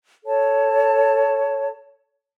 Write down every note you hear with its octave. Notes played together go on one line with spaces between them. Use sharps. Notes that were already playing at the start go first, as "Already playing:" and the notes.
A4 C#5 A5